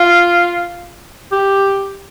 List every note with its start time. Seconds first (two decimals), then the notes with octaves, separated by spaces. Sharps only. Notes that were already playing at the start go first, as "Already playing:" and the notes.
Already playing: F4
1.32 G4